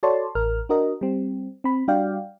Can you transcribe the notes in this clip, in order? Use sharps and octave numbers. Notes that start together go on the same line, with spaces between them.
F#4 A4 C#5 D5 A5 C6
A1 A#4 F6
D4 F#4 A#4 D#5
G3 C4
C4 B5
G3 D4 F#4 D5 F5 G5